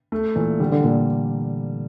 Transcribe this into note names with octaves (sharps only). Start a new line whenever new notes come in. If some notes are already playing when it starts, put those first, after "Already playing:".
A3
A#2 E3
D3 G3
D3
A#2